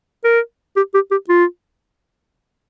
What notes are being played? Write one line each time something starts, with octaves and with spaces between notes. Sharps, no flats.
A#4
G4
G4
G4
F4